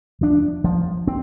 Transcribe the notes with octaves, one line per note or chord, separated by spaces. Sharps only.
F3 D4
F3
C4